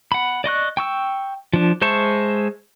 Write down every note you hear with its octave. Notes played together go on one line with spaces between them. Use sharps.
F#5 B5
D5 D#5 C#6 F#6
G5 C#6 E6
F3 D4
G#3 C5 E5 A5 C#6